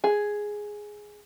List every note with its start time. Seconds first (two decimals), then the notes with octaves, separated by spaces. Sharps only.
0.04 G#4